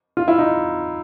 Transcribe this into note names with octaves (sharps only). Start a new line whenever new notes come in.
F4
E4
D#4